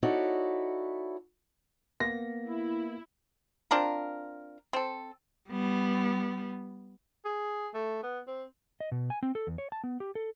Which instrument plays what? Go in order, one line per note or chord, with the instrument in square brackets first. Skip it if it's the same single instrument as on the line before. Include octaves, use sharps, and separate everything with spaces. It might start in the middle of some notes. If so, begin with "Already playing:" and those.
[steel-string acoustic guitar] D#4 E4 F#4 A4 C#5 D5
[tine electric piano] A#3 B3 [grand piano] A#6
[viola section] E4
[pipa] C4 D4 F4 A#4
C4 A4
[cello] G3 B3
[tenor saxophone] G#4
A3
B3
C4
[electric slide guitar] D#5
B2
G#5
C4
A4
E2
C#5
A5
B3
G4
A4